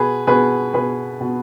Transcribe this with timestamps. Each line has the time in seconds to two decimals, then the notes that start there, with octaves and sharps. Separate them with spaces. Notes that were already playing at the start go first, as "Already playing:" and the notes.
Already playing: B2 G#4 B4
0.27 B2 G#4 B4
0.74 B2 G#4 B4
1.21 B2